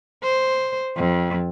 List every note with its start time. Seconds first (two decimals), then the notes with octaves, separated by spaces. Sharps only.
0.23 C5
0.96 F2